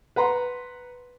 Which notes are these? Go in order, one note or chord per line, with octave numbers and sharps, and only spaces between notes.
B4 F#5 A#5 C6